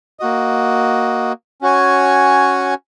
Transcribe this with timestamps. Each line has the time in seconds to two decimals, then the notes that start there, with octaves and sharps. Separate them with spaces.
0.20 A#3 F#4 D#5
1.61 C#4 F#4 C#5 G#5